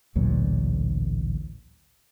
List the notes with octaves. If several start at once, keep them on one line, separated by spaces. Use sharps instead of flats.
A1 D2 A#2 F#3